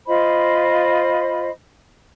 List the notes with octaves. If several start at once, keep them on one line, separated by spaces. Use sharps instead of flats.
F4 C5 D#5 B5